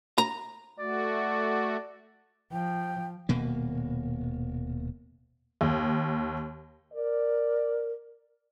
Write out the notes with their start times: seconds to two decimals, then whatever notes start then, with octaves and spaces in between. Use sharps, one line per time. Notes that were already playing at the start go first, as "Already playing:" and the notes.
0.18 A#5
0.79 A3 F#4 D5
2.52 F3 G5
3.29 D#1 B2 A#3
5.61 D#2
6.94 A#4 D5